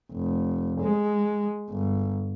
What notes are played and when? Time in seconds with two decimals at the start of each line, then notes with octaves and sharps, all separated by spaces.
0.12 F1
0.81 G#3
1.70 G1